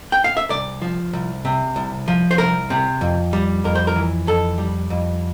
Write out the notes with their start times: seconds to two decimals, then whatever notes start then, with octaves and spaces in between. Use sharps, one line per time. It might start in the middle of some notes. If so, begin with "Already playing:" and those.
0.12 G5
0.24 F5
0.37 E5
0.50 C2 D5
0.82 F3
1.13 C2
1.45 C3
1.76 C2
2.08 F3
2.31 C5
2.38 C2 A#4
2.70 C3
3.01 F2
3.33 G3
3.64 F2 A#4
3.75 C5
3.87 A#4
3.96 E3
4.27 F2 A4
4.58 G3
4.90 F2